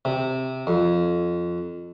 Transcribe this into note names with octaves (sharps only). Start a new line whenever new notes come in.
C3
F2